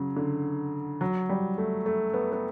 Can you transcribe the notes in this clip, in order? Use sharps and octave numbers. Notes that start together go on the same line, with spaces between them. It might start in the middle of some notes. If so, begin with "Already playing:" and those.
Already playing: C#3 F#3
D3
F#3
G3
A3
A3
B3
B3